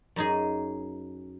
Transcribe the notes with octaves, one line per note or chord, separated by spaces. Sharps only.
F#2 D#4 G#4